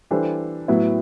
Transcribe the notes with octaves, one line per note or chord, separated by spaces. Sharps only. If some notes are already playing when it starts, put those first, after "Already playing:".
E3 G3 D4 A4 C5
A2 F#3 B3 E4